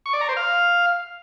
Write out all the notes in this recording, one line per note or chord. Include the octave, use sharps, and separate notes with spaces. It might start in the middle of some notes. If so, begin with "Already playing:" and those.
C#6
D5
A#5
C5
F5